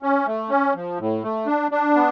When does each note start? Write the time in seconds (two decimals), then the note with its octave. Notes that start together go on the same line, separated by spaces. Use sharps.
0.02 C#4
0.26 A3
0.50 C#4
0.75 F3
0.99 A2
1.23 A3
1.46 D4
1.71 D4
1.95 B3